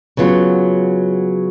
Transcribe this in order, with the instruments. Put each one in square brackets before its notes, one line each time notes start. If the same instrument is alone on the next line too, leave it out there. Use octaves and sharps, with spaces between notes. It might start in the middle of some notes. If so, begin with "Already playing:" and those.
[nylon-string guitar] C#3 F#3 B3 F4